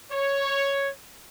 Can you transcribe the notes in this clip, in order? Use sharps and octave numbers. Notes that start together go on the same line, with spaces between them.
C#5